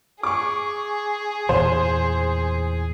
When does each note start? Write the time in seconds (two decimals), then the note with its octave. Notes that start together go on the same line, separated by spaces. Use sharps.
0.23 G#4 C#6 D6
1.49 E2 A#2 E3 C5